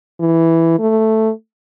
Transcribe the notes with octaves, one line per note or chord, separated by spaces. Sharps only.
E3
A3